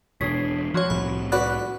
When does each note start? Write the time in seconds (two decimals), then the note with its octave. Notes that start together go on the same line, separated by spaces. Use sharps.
0.21 E1 B2 D4 G#4 C#5 B6 C7
0.74 F3 F#4 G#4 C#5
0.90 C2 A2 C3 B5
1.32 F#4 B4 D5 F#5 B5 F#6